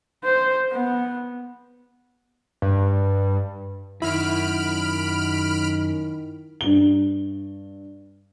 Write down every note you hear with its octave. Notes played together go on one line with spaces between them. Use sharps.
C5
B3
G2
F#2 D#3 E4 B5 F6 D7
G2 G7